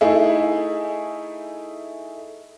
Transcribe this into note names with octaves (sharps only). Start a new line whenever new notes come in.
A3 D#4 E4 G#4